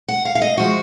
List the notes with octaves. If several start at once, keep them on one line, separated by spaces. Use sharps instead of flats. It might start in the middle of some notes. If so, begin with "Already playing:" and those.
F#5
F5
F5
D#5
F3 G#3 F#4